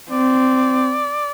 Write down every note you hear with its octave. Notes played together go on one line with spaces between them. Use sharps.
C4 D5